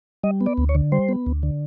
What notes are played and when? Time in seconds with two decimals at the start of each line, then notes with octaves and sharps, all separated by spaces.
0.23 G3 D#5
0.41 B3
0.46 D5
0.58 D2
0.69 C#5
0.75 D3
0.92 G3 C5
1.09 B3
1.26 D2
1.43 D3